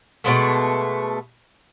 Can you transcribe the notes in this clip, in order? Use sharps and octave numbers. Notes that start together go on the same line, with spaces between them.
B2 G#3 A3